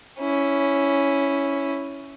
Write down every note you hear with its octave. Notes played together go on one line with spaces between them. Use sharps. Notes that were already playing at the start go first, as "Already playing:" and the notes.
C#4 E4